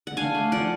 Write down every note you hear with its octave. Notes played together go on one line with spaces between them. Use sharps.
F#5
D4 F5 G#5
A3
F3 D5 F#5